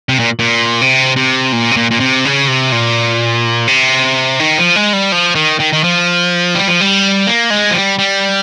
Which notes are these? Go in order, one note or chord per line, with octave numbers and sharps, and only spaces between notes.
C3
A#2
A#2
C3
C3
A#2
C3
A#2
A#2
C3
C#3
C3
A#2
C3
D#3
F3
G#3
G3
F3
D#3
D#3
D#3
F3
G3
F3
G3
A#3
G#3
F3
G3
G3